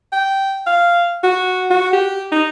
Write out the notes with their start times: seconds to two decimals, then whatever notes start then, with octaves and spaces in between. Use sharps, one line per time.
0.12 G5
0.66 F5
1.24 F#4
1.70 F#4
1.93 G4
2.32 D#4